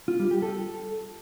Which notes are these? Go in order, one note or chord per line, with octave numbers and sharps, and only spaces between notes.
F4
G3
G4
A4